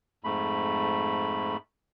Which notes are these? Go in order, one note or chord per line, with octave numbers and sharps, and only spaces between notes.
F2 G#2 A3 B5